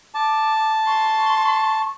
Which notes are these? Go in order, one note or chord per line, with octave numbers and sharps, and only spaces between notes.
A5 D6
C6 C#6